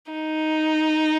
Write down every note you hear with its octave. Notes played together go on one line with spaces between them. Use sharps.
D#4